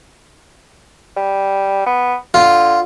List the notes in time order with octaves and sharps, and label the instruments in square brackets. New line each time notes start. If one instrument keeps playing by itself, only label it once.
[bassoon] G3
B3
[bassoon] D3 [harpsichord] F4